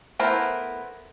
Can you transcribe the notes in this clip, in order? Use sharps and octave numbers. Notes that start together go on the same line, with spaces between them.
A3 B3 E4 A#4 C5